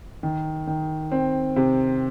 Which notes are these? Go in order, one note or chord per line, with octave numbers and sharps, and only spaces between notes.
D#3
D#3
C4
C3